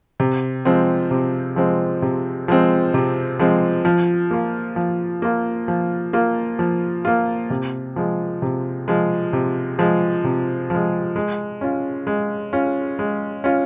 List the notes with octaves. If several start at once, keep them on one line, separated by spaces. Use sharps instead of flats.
C3
F3 G#3 C4
C3
F3 G#3 C4
C3
F3 G#3 C4
C3
F3 G#3 C4
F3
A#3 F4
F3
A#3 F4
F3
A#3 F4
F3
A#3 F4
C3
F3 G#3
C3
F3 G#3
C3
F3 G#3
C3
F3 G#3
G#3
C#4 F4
G#3
C#4 F4
G#3
C#4 F4